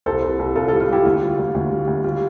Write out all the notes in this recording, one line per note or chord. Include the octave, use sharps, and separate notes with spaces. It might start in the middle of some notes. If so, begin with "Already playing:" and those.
C2 A4 C5
C2
C2
C2 F4 A4
G3 F4 A4
F4
G3 E4 G4
D2 F4
G3 F4
D2
D2 F4
G3
D2
G3 F4